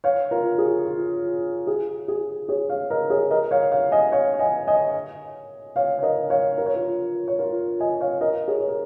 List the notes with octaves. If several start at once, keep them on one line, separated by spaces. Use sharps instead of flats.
C#5 F5
F4 A#4
G#4
F4
F4
G#4
G#4
G#4 C#5
C#5 F5
A#4 D#5
G#4 C#5
A#4 D#5
C#5 F5
C#5 F5
D#5 G#5
C#5 F5
D#5 G#5
D#5 G#5
C#5 F5
C#5
A#4 D#5
C#5 F5
A#4
C#5
F4 A#4
C#5
F4 A#4
D#5 G#5
C#5 F5
A#4 D#5
G#4 C#5
C#5
A#4